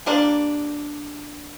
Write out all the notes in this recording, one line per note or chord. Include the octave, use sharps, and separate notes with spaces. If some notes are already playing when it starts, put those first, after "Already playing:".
G3 A#3 D4